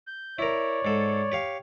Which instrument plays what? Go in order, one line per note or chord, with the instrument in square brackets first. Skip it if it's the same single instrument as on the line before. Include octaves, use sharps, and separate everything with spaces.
[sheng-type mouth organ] G6
[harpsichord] E4 A#4 [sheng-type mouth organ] C#5 D5
[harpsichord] G#2 A4
G4 C#5 F5